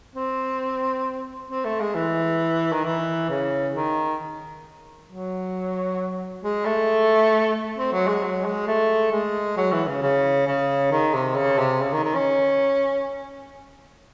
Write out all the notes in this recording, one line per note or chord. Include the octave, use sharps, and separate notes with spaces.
C4
C4
A3
G#3
E3
D#3
E3
C#3
D#3
F#3
G#3
A3
C4
F#3
G#3
F#3
G#3
A3
G#3
F#3
E3
C#3
C#3
C#3
D#3
C3
C#3
C3
C#3
D#3
D#3
C#4